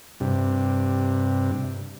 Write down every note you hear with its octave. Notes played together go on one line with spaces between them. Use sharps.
G2 C3